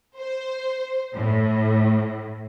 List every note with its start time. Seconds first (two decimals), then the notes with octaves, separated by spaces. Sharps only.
0.17 C5
1.14 A2